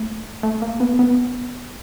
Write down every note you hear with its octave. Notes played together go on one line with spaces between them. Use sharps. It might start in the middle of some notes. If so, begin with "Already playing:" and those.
Already playing: A3
A3
A#3
B3
B3